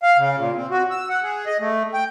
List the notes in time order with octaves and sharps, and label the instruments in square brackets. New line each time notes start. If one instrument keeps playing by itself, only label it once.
[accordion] F5
C#3
A#2
C4
F#4
E6
F#5
G#4
D#5
A3
G5